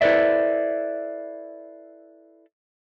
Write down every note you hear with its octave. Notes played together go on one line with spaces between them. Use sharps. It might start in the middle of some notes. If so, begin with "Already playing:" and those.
E4 A4 B4 C5 D5 E5